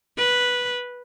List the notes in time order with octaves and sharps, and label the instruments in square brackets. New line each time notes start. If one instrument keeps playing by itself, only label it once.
[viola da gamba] B4